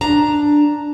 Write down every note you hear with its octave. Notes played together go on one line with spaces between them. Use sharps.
D4 A#5